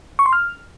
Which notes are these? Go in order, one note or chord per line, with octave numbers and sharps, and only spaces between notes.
C#6
C6
F6